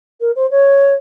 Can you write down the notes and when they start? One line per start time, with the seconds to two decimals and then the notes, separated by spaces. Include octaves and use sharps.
0.20 A#4
0.35 C5
0.50 C#5